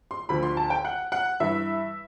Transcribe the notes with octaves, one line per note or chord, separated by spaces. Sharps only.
C6
D2 D3 F3 B5
C6
A5
G5
F#5
F#5
G2 E3 E5